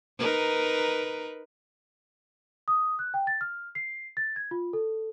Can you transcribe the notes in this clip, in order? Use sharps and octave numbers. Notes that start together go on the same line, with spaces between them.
D#4 A#4 B4
D#6
F#6
G5
A6
F6
C7
A6
G#6
F4
A4